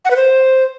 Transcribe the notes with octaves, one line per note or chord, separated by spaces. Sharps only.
F#5
B4
C5